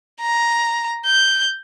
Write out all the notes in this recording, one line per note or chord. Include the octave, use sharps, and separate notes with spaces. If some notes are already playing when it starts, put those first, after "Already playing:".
A#5
G6